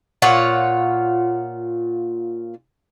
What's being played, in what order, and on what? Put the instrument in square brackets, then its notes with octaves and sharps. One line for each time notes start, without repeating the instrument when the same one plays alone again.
[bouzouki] A#2 F4 C#5 F#5